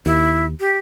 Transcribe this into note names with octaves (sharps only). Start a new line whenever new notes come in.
D#2 E4
G4